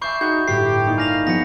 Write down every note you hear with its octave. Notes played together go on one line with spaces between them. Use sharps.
D5 E5 G#5 B5 C#6 G6 C7
D#4 F#4 G#4 F#5 G6
G1 A2 G4 C7
A#3 D#4 D5
F5 G#5 A#6 F7
F3 B3 G#4 F5 A#6 C#7